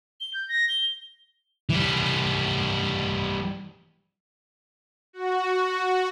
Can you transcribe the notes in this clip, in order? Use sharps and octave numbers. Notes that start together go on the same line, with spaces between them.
G7
G6
A#6
G7
E3 G3
F#4